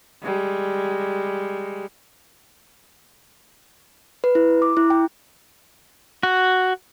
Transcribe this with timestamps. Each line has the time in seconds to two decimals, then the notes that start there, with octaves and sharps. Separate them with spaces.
0.23 G3 G#3
4.24 B4
4.35 E4
4.62 D6
4.77 E4
4.90 G5
6.23 F#4